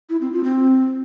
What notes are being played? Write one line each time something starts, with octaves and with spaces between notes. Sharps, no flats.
E4
C4
F4
C4